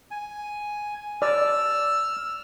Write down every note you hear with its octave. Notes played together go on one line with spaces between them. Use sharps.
G#5
D5 E6 F6